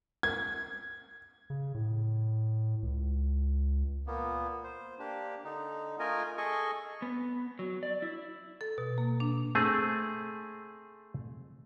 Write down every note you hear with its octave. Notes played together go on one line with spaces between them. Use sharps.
G#6
C#3
A2
C#2
A#2 A#3 B3
C5
A#3 D4 G4
D3 D#4
A3 F4 A#4 D#5 G#5
G#4 A4 D#5 G#5 C#6
B3
F#3
D5
E4
A4
B2
A#3
D4
A3 C4 G#4